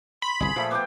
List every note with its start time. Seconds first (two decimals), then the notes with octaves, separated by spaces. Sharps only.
0.22 B5 C6
0.40 G1 C2 G#4
0.56 A#2 F3 A3
0.71 B3 G5 D6